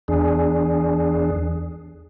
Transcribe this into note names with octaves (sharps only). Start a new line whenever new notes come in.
E2 D4 G#4